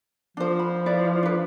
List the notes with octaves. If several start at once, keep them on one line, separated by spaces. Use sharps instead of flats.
F3 D4 C5
B5
E4 B4 D5
D4 B4